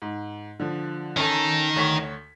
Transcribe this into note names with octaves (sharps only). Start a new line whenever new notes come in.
G#2
D3 F3
D#3 C#4 D#4 A4
D2 C#5 B6